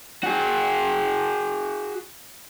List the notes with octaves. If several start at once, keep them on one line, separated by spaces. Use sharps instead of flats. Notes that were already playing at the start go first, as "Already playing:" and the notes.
F#4 G#4